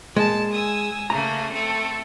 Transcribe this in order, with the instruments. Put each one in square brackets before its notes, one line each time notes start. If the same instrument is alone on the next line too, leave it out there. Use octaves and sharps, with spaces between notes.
[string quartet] A#2 A5 [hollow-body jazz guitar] G#3
[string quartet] G#5 D#6 E6
[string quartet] C#3 A3 A#3 [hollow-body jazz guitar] A#5
[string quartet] A3 C4 A4